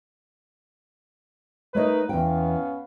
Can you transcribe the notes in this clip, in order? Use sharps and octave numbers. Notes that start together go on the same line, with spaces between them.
A3 D#4 A#4 B4 C#5 D#5
E2 B3 C#4 F5 G5